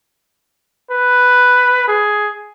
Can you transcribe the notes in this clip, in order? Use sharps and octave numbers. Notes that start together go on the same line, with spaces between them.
B4
G#4